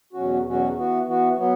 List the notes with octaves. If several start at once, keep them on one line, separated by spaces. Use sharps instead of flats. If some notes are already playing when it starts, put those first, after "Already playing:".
E2 B2 F#3 C#4 F#4
E2 B2 F#3 C#4 F#4
E3 B3 F#4
E3 B3 F#4
F#3 B3